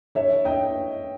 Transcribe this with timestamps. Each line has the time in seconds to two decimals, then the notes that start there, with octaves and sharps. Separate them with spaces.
0.15 C#5 E5
0.45 D#5 G5